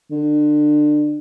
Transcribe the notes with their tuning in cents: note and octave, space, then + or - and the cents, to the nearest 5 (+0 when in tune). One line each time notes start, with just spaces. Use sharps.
D3 +25